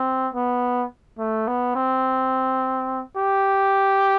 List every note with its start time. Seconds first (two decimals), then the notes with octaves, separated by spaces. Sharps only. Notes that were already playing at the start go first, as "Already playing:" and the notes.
Already playing: C4
0.34 B3
1.19 A3
1.47 B3
1.75 C4
3.17 G4